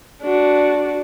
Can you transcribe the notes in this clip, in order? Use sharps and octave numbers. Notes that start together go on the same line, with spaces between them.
D4 F#4